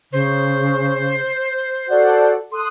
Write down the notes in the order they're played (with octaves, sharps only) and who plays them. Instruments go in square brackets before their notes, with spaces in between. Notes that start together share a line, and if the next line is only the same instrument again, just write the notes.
[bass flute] C#3 [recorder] C5
[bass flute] F#4 [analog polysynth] A4 D5 F#5
[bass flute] A4 [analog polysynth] C6 D#6 F#6